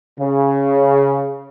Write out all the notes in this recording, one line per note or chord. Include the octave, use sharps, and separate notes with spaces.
C#3